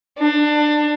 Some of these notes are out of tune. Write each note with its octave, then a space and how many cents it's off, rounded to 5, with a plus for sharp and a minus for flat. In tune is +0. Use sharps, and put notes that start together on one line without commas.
D4 +20